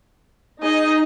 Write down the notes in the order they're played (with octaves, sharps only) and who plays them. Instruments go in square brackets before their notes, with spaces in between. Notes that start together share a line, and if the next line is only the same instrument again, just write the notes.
[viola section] D#4 [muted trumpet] G#4 [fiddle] D#5